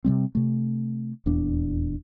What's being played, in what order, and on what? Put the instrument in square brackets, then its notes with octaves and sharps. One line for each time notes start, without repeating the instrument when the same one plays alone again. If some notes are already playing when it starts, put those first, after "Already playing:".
[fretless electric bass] C3 D#3 G3 C4
C3 A3
D#1 E2 B3 D4